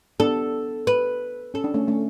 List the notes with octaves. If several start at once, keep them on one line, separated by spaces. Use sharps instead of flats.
B3 D4 A4
B4
C#4 A4
D4
A3 C#4
A3 C#4